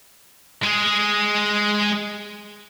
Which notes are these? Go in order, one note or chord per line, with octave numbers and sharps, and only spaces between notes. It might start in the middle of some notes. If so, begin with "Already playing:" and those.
G#3 G#4